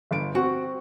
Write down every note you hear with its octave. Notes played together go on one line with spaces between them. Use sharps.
G1 D7
C4 F#4